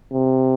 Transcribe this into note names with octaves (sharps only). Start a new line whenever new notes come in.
C3